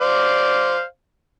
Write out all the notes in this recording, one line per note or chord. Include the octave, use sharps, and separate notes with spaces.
C5 D5 F5